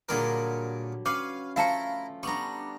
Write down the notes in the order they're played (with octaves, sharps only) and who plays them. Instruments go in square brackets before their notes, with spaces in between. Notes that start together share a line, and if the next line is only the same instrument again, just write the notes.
[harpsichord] A#2 G#4 A#4 [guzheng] D3 F#3 G3
[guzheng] C#4 B4 C#5 [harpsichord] F5 [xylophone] D6
[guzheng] F3 A3 F4 [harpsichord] E4 A#5 [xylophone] F5 A5 C#7
[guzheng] G3 B3 D4 [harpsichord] A#5 C#6